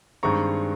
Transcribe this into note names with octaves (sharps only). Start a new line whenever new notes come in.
G2 D#3 G#3 C4 A#5 C#6